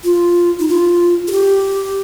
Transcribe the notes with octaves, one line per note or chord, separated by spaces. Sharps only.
F4
D#4
F4
G#4
G4